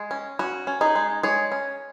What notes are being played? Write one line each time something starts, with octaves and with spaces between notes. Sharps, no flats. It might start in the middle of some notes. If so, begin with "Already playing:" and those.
Already playing: G#3
C#4
C#4 F#4
C#4
D#4 G#4
G#3
G#3 G#4 C#5
C#4